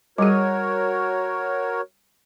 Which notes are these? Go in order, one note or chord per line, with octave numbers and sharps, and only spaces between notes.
G3 F#4 G#4 A#4 C#5